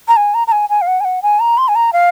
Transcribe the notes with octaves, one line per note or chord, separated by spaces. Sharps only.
A#5
G#5
A#5
A#5
G#5
G#5
F5
F#5
G#5
F#5
G#5
A#5
C6
G#5
A#5
F5